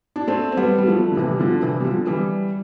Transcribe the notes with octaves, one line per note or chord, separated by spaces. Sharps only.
D4
A3 C4
C4
G3 B3
G3
F3 A3
D3
C3 E3
G3
D3 F3
C3 E3
G3
D3 F3
E3 G3